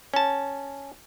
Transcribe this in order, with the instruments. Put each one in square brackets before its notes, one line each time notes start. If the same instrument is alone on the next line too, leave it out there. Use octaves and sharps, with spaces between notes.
[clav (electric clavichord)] C#4 A5